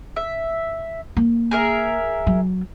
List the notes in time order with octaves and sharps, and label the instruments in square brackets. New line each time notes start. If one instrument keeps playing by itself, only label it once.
[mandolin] E5
[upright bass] A#3
[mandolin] G#4 A#4 E5
[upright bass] F#3